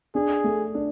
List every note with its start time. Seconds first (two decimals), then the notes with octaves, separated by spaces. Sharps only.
0.15 D4 G#4
0.44 A3
0.75 D4